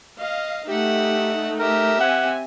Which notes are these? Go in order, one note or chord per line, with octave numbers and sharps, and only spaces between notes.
D#5 F5
A3 D#4 G4 E5 F#5
G4 A#4 E5
C4 F#5 G#5